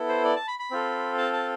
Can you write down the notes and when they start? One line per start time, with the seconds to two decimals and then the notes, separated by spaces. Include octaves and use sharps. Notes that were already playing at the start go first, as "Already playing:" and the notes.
Already playing: B3 E4 A4
0.08 C5
0.24 D5
0.36 A5
0.48 B5
0.59 B5
0.71 C4 F4 A4
1.18 A5
1.33 A5